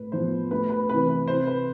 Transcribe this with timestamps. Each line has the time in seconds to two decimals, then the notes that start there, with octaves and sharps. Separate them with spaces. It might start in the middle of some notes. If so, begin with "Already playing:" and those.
Already playing: A2 B4
0.12 F3 B3 C5
0.51 D2 B4
0.70 B4
0.89 C3 E3 B4
1.09 B4
1.28 C3 C5
1.47 B4